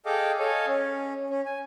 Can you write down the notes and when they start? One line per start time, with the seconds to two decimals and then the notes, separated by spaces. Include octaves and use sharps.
0.06 G#4 A4 D#5 F5 G5 D6
0.39 A4 C#5 D#5 F5 G#5
0.67 C#4
1.30 C#4
1.46 G#5